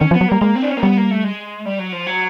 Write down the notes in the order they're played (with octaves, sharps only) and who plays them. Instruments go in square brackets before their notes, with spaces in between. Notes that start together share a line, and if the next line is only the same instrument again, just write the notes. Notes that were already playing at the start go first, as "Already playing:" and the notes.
[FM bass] D#3 [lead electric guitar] C#4
[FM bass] F3
[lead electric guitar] B3
[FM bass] F#3
[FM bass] G3 [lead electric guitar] A#3
[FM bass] G#3 [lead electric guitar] A#3
[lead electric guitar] C4
D4
C#4
A#3
[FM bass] G3 [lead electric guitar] B3
[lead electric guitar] A#3
A3
G#3
G3
F#3
F3
F#3